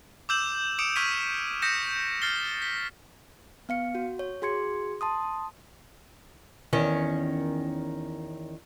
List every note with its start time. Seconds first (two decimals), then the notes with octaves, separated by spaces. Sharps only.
0.29 D6 E6 G6 E7 F#7
0.79 D6 D#6 C#7 D7 E7 F7
0.96 C#6 F6 G#6 B6 D#7
1.62 D#6 G6 A#6 B6 C#7 E7
2.22 F6 A6 C7 G7
2.62 B6 G7
3.69 B3 F5 C#7
3.95 F#4
4.19 C#5
4.42 F#4 G#4 C6 G#6 C#7
5.01 A5 C6 D#6
6.73 E2 D#3 C#4